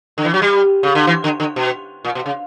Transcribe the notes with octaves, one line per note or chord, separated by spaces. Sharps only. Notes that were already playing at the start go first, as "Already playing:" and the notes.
D3
E3
F#3
G3
C#3
D3
E3
D3
D3
B2
A#2
B2
C#3